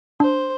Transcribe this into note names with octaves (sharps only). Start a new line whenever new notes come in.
D4 C5